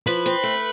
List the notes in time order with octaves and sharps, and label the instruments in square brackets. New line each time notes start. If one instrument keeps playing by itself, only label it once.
[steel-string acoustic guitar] F3 [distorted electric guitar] B4
[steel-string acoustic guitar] C4
A3